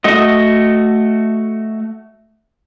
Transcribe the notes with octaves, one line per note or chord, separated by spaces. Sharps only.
A3 F#4 D#5